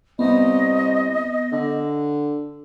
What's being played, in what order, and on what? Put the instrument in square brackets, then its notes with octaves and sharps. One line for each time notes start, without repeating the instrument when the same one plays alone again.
[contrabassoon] C2 [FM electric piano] B3 [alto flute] D#5
[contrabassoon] D3